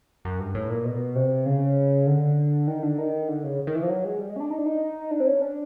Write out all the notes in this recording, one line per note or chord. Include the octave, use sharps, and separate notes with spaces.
F#2
G2
A2
A#2
B2
C3
C#3
D3
D#3
D3
D#3
D3
C#3
D#3
E3
F3
F#3
G#3
G3
G#3
C#4
D4
D#4
D4
D#4
D4
C4
C#4
D4